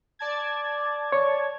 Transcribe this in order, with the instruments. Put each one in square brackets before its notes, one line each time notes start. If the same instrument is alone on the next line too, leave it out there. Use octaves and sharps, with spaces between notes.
[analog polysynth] D5 A5 G#6
[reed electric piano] C#5